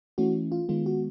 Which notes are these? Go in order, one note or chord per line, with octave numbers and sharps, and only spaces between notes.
E3 A3 C#4 E4 F#4
F4
D#3 G#3 B3 F4
F#4